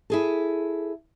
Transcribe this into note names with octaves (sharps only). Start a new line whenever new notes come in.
E4 G#4 A4